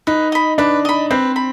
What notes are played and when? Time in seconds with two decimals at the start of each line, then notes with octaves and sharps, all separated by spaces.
0.07 D#4 B4
0.32 D#5 B5
0.58 D4 B4
0.85 D#5 B5
1.11 C4 B4
1.36 B5